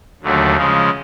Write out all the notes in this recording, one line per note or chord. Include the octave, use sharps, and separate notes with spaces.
D#2 D3 F#3 A3
C#3 F3 G#3